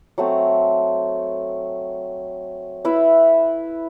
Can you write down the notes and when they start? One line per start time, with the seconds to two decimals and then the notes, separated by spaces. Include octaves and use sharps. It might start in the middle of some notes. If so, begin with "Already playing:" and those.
0.18 F#3 A3 C4
2.85 E4 B4 E5